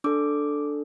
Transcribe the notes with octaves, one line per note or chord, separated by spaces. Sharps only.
D4 A4 D6